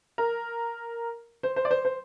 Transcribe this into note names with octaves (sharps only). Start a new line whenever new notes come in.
A#4
C5
C5
D5
C5
C5